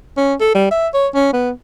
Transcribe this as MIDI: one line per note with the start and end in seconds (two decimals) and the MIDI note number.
0.17 0.34 61
0.40 0.50 69
0.55 0.66 55
0.71 0.88 76
0.94 1.08 73
1.15 1.32 61
1.33 1.51 59